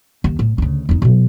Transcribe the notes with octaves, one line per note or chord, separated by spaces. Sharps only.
D#2
A2
D2 C#3
E2 D#4
B2 F#3